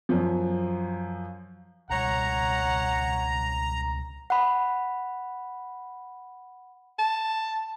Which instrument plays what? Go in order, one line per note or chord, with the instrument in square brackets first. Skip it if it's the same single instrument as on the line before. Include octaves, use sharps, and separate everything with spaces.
[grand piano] F#2 F3
[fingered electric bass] C#2 B2 G3 [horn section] C#5 F#5 [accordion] A#5
[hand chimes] F#5 B5
[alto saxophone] A5